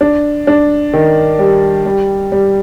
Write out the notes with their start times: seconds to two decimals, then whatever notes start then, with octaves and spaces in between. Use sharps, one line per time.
0.01 D4
0.47 D4
0.93 D#3
1.39 G3
1.86 G3
2.32 G3